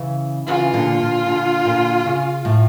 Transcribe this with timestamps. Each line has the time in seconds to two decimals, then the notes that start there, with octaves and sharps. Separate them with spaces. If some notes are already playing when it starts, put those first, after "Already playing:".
Already playing: C#3 E3
0.47 C#3 E3 F4
0.74 A#2 D3
1.00 A#2 D3
1.26 A#2 D3
1.65 A#2 D3
2.06 C#3
2.45 A2